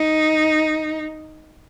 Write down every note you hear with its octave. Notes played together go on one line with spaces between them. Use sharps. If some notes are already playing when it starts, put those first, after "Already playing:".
Already playing: D#4